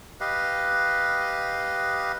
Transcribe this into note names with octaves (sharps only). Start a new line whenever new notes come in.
G4 B4 D#5 F5